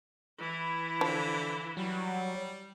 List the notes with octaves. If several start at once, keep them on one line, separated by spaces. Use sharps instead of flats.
E3 E4
D3 F3
F#3 G3